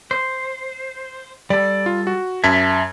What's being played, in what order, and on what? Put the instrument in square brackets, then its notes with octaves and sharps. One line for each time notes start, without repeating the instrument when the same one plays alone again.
[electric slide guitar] C5
[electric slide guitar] G3 A4 [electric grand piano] D5
[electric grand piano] F4
F#4
[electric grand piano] F#2 A5 G#6 [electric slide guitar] E5